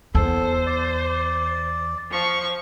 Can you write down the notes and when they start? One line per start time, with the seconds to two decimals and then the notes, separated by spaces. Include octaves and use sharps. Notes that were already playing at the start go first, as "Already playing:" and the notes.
0.15 E2 A4 C5
0.66 D5
2.11 F3 C#6